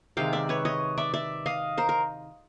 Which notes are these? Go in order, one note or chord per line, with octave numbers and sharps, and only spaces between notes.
C3 D#3 G#3 F5 G5
D5 E5
B4 C#5
C#5 D#5
D5 E5
D5 E5
D#5 F5
A#4 C5
A#4